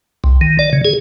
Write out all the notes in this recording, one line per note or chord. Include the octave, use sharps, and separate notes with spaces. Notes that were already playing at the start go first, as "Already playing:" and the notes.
C2
D#3
D5
C#3
G#4